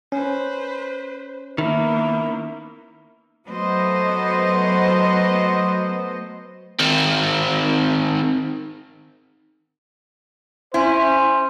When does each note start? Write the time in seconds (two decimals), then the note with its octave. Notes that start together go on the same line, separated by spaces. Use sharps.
0.12 C#4 B4 C5
1.58 D#3 A#3 B3 E4
3.47 F#3 A3 B3 C5 D#5
6.80 D#3 C4
10.74 C#4 E4 C5